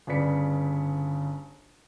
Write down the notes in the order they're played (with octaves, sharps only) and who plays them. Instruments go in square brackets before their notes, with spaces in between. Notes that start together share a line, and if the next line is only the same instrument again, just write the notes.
[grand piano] G1 C#3 B4 D5 B6 C#7